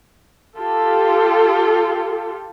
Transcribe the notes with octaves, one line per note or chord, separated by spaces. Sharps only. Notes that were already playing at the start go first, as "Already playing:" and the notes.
F4 G4 A4